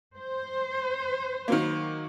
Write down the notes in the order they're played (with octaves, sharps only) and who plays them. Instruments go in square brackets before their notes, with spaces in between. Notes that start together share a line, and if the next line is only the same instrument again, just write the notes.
[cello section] C5
[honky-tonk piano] D#3 F#3 A#3